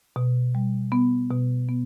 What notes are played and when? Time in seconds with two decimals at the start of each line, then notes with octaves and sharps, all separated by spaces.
0.16 B2
0.55 G3
0.92 B3
1.30 B2
1.69 B3